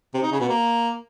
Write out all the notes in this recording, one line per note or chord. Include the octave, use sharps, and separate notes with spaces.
C3
D#4
C#3
B2
A#3